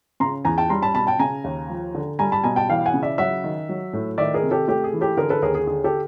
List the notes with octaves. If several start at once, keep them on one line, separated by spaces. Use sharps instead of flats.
C#3 A#5 C6
E2 G#5 A#5
G5 A5
G3 A#5 C6
A5 B5
B2 A5 B5
G5 A5
C#3 G#5 A#5
D#2
F3
D3
G3 G#5 A#5
A5 B5
B2 G#5 A#5
G5 A5
E3 F5 G5
F#5 G#5
C#3
D5 E5
F#3 E5 F#5
D#3
F#3
A2
D#3 D5 E5
G#4 A#4
C3
G4 A4
A3 G4
G#4
E3
G4 A4
D3 G#4 A#4
A4 B4
D#2 G#4 A#4
G#4
D3 G#4
G4 A4